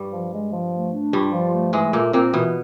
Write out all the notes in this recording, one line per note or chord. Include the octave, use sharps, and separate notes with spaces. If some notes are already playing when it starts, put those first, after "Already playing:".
Already playing: G2 G3
F3
G#3
F3
A3
D4
G2 G3 F4
F3
A3
G#2 E3 G#3
A#2 A3 A#3
A#2 A#3 C4
B2 E3 B3